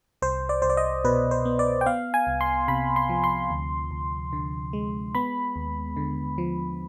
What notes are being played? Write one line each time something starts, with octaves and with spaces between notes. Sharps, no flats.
C2 C5
D5
C2 C5
D5
D#5
B2 B4
C5
B3
D5
G5
B3 F5
G#5
C2
C6
C3 B5
C6
F3
C6
D2
D2
D3
G#3
B3 B5
D#2
D3
F3